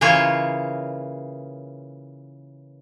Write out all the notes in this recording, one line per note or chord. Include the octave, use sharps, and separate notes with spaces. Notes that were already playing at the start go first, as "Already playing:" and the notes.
C#3 E3 A#3 F4 C#5